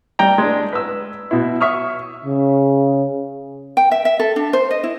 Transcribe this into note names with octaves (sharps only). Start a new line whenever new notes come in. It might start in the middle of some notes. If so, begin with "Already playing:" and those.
G3 G5 A#5
G#3 D4
B4 E6
B2 E4
E5 C#6 D#6 F6
C#3
G5
E5
E5
A4
D4
C5
D#5
E4